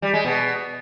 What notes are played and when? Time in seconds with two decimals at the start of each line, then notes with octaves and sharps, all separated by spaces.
0.02 G3
0.13 G#3
0.25 B2